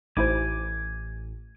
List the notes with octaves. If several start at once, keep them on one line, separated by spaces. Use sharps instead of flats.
A1 D#4 E4 C5 G#5 D6